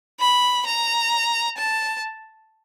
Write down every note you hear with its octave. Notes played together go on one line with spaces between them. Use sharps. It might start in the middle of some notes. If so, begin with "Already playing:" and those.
B5
A#5
A5